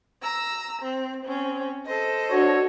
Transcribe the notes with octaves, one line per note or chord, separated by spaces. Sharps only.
A#5 E6
C4
C4 C#4
A4 C5 D#5
D4 F#4 C#5